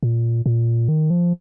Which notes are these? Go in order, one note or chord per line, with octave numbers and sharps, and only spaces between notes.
A#2
A#2
D#3
F3